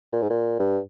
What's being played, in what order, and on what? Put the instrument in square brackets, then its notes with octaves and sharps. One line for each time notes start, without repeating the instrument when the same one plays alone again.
[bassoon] A#2
G#2
A#2
G2